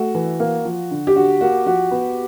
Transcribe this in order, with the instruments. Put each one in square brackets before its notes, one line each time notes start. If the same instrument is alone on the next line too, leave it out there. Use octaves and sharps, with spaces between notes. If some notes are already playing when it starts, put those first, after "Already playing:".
Already playing: [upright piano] A3 [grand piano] F#4
[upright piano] E3
A#3
F3
D3
[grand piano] G4
[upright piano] D3 [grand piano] F#4
[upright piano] A#3 [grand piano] F#4
[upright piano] F3 [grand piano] F#4
[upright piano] B3